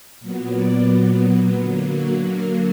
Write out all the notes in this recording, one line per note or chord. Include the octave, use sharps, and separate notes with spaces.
A#2 F#3 B3
D5
D3 F#3 A#3
F#4
A#4